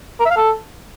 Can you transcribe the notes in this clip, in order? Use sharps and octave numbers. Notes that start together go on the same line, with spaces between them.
A#4
E5
F5
A4